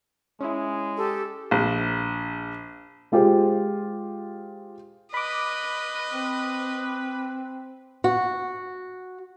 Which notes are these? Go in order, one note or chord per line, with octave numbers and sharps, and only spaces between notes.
G#3 C#4 E4
G4 A4
A#1
G#3 F4 G4 C5
B4 D#5 B5 D6
C4
F#4